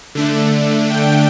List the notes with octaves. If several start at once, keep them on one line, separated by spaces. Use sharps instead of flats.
D3 A3 D4
G5